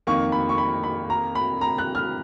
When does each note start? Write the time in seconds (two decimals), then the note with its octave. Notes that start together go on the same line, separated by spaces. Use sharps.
0.07 F2 D#3 A#3 C#6
0.32 B5
0.49 C#6
0.58 B5
0.84 B5
1.10 A#5
1.35 B5
1.61 A#5
1.78 F#6
1.95 F6